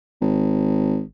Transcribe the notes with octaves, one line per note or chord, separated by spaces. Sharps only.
G#1